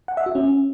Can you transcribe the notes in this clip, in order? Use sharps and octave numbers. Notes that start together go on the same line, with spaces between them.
F#5
E5
F#4
C#4